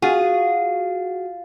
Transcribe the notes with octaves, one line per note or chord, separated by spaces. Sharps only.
F4 F#4 G#4